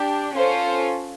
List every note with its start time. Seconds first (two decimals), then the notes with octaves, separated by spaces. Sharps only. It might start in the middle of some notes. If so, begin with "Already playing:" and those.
Already playing: D4 G4
0.35 C#4 F4 A4 C5